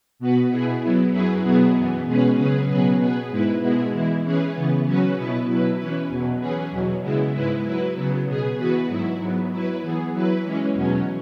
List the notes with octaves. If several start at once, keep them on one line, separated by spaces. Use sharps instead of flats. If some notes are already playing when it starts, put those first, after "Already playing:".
B2 B3 F#4 B4
B2 B3 E4 G#4
F#3 B3 E4
F#2 F#3 E4 G#4 B4
B2 F#3 B3 E4 G#4
F#2 E3 B3
B2 G#3 C#4 G#4 B4
C#3 F#3 C#4 G#4 B4
B2 F#3 B3 G#4 B4
B2 B3 G#4 B4
G#2 G#3 E4 B4
B2 G#3 B3 E4 G#4
E3 G#3 E4
E3 C#4 G#4 B4
C#3 E3 B3
F#3 C#4 F#4 B4
B2 B3 E4 B4
B2 F#3 E4 B4
E3 C#4 E4 B4
E2 B2 F#3
E3 C#4 G#4 B4
E2 B2 F#3
C#3 G#3 B3 E4
G#2 G#3 E4 B4
F#3 E4 B4
C#3 F#3 B3
B2 B3 G#4
E3 B3 F#4 B4
G#2 F#3 E4
G#2 F#3 B3
F#3 E4 B4
E3 B3 G#4
F#3 E4 B4
E3 G#3 C#4
E2 B2 F#3 C#4